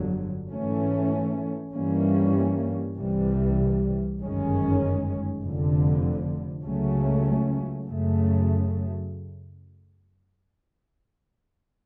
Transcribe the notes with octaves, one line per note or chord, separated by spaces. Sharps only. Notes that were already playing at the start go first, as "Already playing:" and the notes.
Already playing: G1 F2 D3 F#3
G#2 E3 A3 C#4
G2 E3 G3 A#3 C#4
C2 C3 E3 G3
G1 F#2 D#3 G#3 C#4
F1 F2 D3
C#2 C#3 F#3 A3 C#4
F#2 C#3 F#3 A3